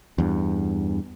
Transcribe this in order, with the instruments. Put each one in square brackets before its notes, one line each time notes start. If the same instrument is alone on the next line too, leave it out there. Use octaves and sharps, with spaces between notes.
[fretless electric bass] E2 G2